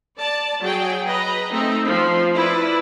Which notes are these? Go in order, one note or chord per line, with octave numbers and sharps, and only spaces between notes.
D5 A5
F#3 G#4 G5
B4 D#5 A#5
A3 C4 D#4 E5
F3
E4 B4 D5